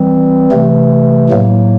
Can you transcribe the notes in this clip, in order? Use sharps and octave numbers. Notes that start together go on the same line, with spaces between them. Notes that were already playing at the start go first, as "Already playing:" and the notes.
Already playing: E3 G3 C4
C3 E3 A3
A2 F#3 A#3